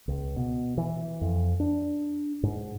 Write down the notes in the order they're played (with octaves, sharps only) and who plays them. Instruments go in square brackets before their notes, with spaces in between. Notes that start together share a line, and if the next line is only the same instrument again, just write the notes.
[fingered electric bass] C#2
B2
E3
F2
D4
G#2